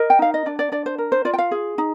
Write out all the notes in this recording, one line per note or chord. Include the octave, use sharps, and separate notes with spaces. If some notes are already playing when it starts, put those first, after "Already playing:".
Already playing: A#4 D#5
G5
D#4 F5
D#5
D4 D5
D5
D4 D5
C5
A#4
C5
F4 D5
G5
F5
G#4
D#4